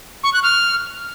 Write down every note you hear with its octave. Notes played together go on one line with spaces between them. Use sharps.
C#6
F#6
F6